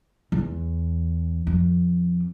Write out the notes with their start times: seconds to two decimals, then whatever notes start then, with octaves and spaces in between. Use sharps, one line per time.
0.32 E2
1.47 F2